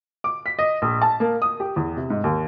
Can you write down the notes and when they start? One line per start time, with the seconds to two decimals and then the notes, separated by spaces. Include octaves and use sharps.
0.24 D6
0.46 B6
0.59 D#5
0.82 A#1
1.02 A5
1.20 A#3
1.42 D#6
1.60 G4
1.76 E2
1.97 C3
2.10 G#2
2.24 D#2